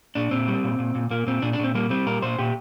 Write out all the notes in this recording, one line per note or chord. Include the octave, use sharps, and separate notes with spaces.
A#2 D4
A#2 C4
G3
A#2
A#2
A#2
A#2 A#3
A#2 C4
A#2 D4
D4
A#2 C4
G3 A#3
G3 C4
A#2 A#4
A#2 C5
A#2 G4